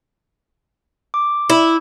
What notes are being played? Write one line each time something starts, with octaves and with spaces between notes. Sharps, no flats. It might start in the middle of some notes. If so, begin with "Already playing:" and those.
D6
E4